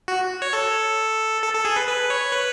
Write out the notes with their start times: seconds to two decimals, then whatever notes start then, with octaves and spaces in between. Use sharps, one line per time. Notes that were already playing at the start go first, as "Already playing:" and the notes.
0.08 F#4
0.42 C#5
0.53 A4
1.42 A4
1.54 A4
1.65 G#4
1.76 B4
1.87 B4
2.10 C#5
2.32 B4